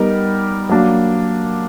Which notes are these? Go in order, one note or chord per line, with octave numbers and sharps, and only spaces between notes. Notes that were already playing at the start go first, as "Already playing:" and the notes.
Already playing: G3 B3 D#4 G4 A#4
F#3 A#3 D4